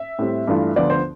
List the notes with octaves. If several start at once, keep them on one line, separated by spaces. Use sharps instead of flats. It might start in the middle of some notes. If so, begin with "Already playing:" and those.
Already playing: E5
A2 G3 C4
G2 E3 A3 D4 F4
D2 D3 F3 B3 F4 D5
C5